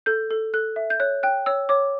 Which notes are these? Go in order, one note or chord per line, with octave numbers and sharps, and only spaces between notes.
A4 G6
A4
A4 F#6
E5
G6
C#5 F#6
G5 F#6
C#5 E6
C#5 D6